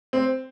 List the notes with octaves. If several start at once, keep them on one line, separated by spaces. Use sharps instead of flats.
C4